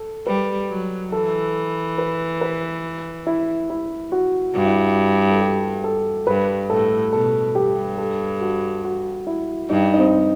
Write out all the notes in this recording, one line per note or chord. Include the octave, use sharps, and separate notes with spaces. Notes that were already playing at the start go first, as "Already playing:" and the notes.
Already playing: A4
G3 B4
F#3
E3 A4
B4
B4
E4
E4
F#4
G2 F#4
E4
F#4
A4
G4
A4
G2 B4
A2 A4
B2 A4
G2 G4
A4
F#4
F#4
E4
G2 D#4
D#4
C4